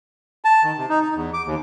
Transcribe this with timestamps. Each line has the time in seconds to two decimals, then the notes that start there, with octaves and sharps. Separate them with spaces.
0.44 A5
0.64 D#3
0.77 C3
0.89 D#4
1.02 D#4
1.15 E2
1.34 D6
1.46 D#2